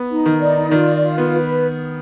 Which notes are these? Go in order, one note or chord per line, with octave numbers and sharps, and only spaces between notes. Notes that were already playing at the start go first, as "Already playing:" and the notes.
Already playing: B3
D#4
D#3
D5
D#3 F4
F4
B3
B4